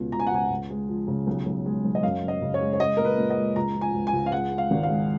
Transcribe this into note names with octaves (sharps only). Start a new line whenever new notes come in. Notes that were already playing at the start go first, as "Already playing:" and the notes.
Already playing: C#2 B2
C#2 A#5
G#5
F#5
C#2 G#5
C#3
G#3
F3
C#3
B1
B1
G#3
B1
D#5
F#2 F5
F#1
D#5
C#3
C#5
G#3
C#5
G#3 D#5
A#2 A#4
B4
A#2
D#5
G#3
C#2 A#5
F3
G#5
C#2
G#5
C#2
F5
G#3 F#5
G#3
F5
G#1
F5
G#3